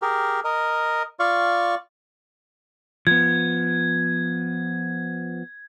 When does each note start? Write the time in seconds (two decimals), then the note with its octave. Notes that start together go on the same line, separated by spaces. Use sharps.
0.02 G4 G#4 A#4
0.44 A#4 D#5
1.20 F4 D5 F5 C#6
3.07 F3 B3 G#6